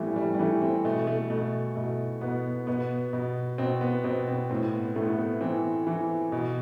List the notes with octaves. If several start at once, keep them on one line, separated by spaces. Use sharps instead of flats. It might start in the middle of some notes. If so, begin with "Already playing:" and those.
Already playing: A2 E3 G3 A3 B3 C4
G3
G3
E3 A3
C4
B2 A3
A3
B2 A3
B2 A3
B2 B3
B2 B3
B2
B2 C4
B3
B2 C4
C4
A2 C4
B3
A2 A3
B3
A3
B3
E3 C4
E3
B2